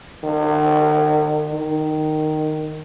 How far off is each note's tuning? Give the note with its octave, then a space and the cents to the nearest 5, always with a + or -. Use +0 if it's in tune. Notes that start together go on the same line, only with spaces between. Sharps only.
D#3 -45
D#3 -10